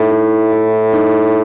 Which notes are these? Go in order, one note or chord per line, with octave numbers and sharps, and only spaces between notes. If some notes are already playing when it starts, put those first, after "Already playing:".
Already playing: A2 D#4 E4
E4
E4
D#4